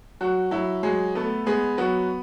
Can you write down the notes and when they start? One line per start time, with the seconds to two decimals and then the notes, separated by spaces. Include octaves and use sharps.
0.21 F#3 F#4
0.51 F#3 E4
0.83 F#3 G#3 G#4
1.15 A3 B3 A4
1.47 G#3 B3 G#4
1.78 F#3 B3 F#4